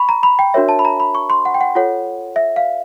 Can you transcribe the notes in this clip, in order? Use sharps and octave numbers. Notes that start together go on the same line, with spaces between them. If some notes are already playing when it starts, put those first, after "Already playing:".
Already playing: B5 C#6
A#5
B5
G5
D4 F#4 A#4 C#5 E5
A5
B5
A#5
B5
C#6
C6
F#5
G5
F#5
F4 A4 C#5 F#5
E5
F5